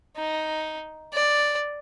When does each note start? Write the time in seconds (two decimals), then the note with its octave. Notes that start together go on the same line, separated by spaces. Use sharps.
0.17 D#4
1.13 D5